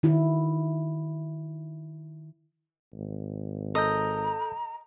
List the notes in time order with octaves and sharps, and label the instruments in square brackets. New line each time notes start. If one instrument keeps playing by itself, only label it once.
[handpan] D#3 E4 F#4
[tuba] G#1
[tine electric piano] A4 G6 [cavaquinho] D#5 [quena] A#5